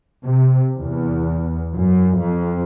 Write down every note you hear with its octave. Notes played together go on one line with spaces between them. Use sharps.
C3
E2
F#2
F2